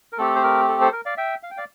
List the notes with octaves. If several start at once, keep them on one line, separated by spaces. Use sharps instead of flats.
A#4
A3 C4 G4 A4
C5
A#4
A4
A4 C5
A#4
D5 F5
E5 G5
F5
G5
D5 F5